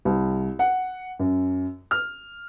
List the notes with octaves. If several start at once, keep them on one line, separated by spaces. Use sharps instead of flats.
C2
F#5
F#2
F6